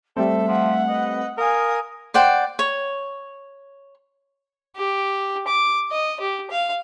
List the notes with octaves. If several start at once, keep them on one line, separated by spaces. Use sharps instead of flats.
G3 A3 C4 A4 E5
F3 F#5
B4 D#5
A#4 F5 G#5 D#6
C5 D5 F#5 G5
C#5
G4
D6
D#5
G4
F5